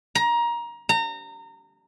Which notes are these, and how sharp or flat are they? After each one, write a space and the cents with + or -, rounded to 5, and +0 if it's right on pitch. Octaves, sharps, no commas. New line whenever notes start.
A#5 +20
A#5 -30